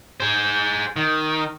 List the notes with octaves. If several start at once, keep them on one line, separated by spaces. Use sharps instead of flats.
G#4 C5
D#3